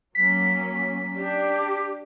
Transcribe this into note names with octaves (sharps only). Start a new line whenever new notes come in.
F#3 A#3 C#4 B6
D4 G4